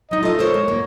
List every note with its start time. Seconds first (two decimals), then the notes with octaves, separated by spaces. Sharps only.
0.11 F#3 D#4 D#5
0.23 A3 F4 D#5
0.39 A4 A#4 C5 C#5
0.54 G#3
0.68 G#2 A#3